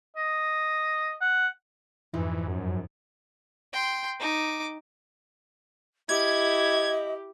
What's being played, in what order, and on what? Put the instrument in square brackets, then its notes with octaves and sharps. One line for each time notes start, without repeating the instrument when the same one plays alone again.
[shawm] D#5
F#5
[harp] F2 G#2 D#4 [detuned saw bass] E3
[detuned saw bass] F#2
[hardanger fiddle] G5 C6
D#4 D6
[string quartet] E4 [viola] G4 [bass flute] D#5 [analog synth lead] G#6